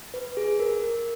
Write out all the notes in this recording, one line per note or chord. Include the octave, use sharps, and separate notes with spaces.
B4
G#4
A#4
A#4